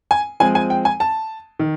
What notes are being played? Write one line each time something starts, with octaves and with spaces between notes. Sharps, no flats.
G#5
F3 G#3 C4 G#5
G#5
G5
G#5
A5
D#3